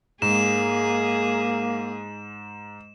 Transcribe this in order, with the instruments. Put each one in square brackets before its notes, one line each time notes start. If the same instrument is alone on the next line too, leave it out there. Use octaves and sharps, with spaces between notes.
[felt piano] G#2 [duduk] A#3 [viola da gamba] G#4 [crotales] E7